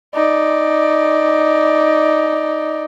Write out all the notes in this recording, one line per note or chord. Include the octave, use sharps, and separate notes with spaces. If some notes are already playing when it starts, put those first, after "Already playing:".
D#4 D5